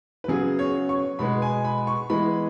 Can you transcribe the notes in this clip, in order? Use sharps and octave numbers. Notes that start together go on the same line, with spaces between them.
B4
C#3 F#3 B3 G#4
C#5
C#6
B2 G#3 B3 B5
G#5
B5
C#6
E3 G#3 B3 B5